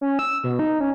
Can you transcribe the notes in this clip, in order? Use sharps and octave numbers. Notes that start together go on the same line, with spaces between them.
C#4
E6
B2
D#4
C#4